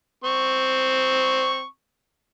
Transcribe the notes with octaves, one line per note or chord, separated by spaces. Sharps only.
C4 C#6